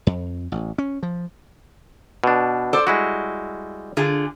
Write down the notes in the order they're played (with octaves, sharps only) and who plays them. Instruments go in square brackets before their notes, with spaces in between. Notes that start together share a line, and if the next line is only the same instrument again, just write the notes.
[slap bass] F2
A1
C#4
F3
[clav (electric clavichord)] B2 D4
[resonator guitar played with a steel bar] A4 C5 D5
[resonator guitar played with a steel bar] G3 [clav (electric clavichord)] G#3 E4 F#4
[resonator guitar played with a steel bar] D3 F4 G#4